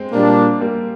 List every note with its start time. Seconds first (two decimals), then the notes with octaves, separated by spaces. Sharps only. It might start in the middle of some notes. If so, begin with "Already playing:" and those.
Already playing: G#3 C4
0.12 A#2 G3 A#3 D4
0.61 G3 A#3